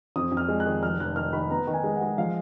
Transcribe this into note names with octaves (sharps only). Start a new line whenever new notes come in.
F2 D#6
F2
F6
G#3
F#6
D#3
F1 F6
F1 F#6
D#3 F6
D#3 B5
B3 A#5
D#3
G#5
G#3
F#5
G#3
F3 F5